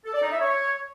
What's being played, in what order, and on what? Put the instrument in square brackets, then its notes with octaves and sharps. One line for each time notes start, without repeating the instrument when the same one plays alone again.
[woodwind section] A4
D5
D#4
E5
C#5